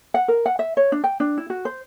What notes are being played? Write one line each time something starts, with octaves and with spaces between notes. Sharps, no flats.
F#5
A#4
F#5
E5
C#5
D4
G5
D4
E4
F#4
C5